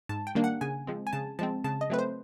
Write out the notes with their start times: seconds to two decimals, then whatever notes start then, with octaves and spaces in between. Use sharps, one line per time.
0.09 G#2 A5
0.27 G5
0.35 D#3 G3 A#3 D4
0.44 F#5
0.61 C#3 G#5
0.87 F3 G#3 C4
1.07 G#5
1.13 C#3 A5
1.39 F3 G#3 C4 A5
1.64 C#3 A5
1.81 D#5
1.90 F#3 A3 C4 B4
1.99 C5